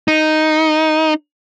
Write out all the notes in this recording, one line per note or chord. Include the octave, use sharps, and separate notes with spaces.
D#4